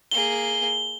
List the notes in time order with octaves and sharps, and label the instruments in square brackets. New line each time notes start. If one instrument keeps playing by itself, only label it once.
[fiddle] A#3 G#4 [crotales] G7